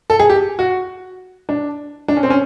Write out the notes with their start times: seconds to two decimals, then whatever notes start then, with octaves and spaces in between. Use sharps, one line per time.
0.10 A4
0.19 G#4
0.30 G4
0.59 F#4
1.49 D4
2.08 D4
2.17 C#4
2.23 C4
2.30 C#4